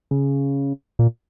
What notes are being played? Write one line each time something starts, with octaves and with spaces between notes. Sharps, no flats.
C#3
A#2